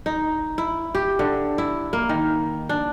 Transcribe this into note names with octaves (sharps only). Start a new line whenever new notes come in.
D#4
E4
G4
D3
E4
A#3
D#3
D4